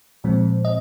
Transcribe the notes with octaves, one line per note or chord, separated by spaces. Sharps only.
A#2 F3 G#3 C4
D#5